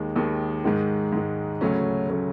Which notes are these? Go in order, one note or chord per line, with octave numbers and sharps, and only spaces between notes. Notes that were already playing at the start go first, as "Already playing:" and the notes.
Already playing: D#2 D#3 G#3
D#2 D#3 G#3
G#2 D#3 G#3
G#2 D#3 G#3
D2 C#3 F#3 A3 C#4
C#3 F#3 A3 C#4